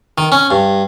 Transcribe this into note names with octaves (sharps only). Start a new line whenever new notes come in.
D#3
C#4
G2